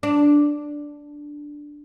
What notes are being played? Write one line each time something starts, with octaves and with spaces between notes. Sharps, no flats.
D4